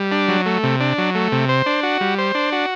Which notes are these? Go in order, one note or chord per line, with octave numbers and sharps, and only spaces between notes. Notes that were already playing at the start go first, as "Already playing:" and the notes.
Already playing: G3
D4
F#3
A3
C3
D4
F#3
A3
C3
C5
D4
F#4
G3
C5
D4
F#4